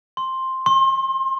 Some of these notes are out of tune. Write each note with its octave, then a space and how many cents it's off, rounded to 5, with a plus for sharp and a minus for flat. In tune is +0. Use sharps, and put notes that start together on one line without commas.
C6 +5
C6 +35